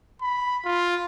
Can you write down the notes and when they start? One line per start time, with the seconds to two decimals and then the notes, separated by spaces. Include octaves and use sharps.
0.21 B5
0.65 F4